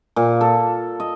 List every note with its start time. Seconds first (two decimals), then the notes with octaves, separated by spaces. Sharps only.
0.16 A#2
0.41 A4
1.00 D#5